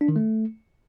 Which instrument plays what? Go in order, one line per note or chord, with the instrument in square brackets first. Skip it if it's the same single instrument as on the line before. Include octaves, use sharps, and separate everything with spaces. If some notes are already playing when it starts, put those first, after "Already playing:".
[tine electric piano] D4
D#3
A3